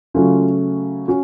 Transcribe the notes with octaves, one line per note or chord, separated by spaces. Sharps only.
C#3 F#3 A3 C#4 F4
C#4 F#4